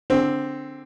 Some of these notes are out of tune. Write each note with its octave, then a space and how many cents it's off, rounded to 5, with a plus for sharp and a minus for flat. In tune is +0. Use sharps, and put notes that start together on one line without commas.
D3 +0 C4 +0 G#4 -10